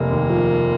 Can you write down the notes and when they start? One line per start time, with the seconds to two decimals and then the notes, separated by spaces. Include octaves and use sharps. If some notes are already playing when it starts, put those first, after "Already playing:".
Already playing: F1 A#3
0.11 D#2
0.30 F3